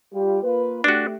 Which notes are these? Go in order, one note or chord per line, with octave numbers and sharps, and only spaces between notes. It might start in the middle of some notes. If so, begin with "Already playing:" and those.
G3 F4 G4
A#3 F4 B4
A3 D4 F#4 G4